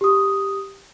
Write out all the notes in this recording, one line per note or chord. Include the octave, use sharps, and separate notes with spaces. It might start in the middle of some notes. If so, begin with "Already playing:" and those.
G4 D#6